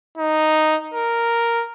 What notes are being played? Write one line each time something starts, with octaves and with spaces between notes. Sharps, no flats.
D#4
A#4